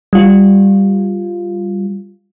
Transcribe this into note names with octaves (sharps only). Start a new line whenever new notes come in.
G3 F4